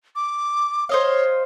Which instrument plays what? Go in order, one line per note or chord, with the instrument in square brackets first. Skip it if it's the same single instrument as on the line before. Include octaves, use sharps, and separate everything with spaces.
[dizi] D6
[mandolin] C5 D#5 F5 [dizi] C#5